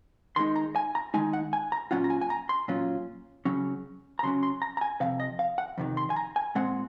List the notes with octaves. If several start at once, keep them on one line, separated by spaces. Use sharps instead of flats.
D#3 G#3 D#4 C6
A#5
G#5
A#5
D#3 G#3 D#4 G#5
F#5
G#5
A#5
A#2 F#3 C#4 F4 F#5
A#5
G#5
G#5
A#5
C6
A#2 F#3 C#4 F4
C#3 F#3 C#4
A#5
C#3 F#3 C#4 C6
C6
A#5
A#5
G#5
F2 C3 F5
D#5
F5
F#5
F2 C3 D#3
C6
G#5
A#5
G#5
A#2 G#3 C4 F#5